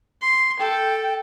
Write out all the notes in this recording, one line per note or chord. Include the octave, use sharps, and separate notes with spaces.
C6
A4 G5